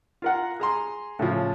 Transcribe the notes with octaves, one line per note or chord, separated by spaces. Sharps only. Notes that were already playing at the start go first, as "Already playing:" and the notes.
F4 A#4 F#5
G#4 A#5 C6
A2 C#3 F3